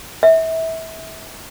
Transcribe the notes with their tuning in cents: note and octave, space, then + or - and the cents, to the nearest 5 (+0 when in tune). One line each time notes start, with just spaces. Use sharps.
E5 -25